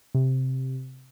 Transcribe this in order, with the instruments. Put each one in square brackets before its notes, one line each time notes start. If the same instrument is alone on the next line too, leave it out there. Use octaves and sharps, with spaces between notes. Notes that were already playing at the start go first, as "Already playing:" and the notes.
[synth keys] C3